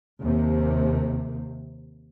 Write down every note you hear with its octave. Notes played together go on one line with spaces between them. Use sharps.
D#2 C3